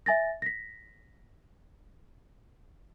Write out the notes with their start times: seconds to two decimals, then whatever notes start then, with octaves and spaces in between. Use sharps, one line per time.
0.06 E5 G#5 A6 A#6
0.42 A#6 B6